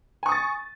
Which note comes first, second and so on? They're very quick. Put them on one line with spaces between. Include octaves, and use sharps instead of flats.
G#5 C#6 D#6 A6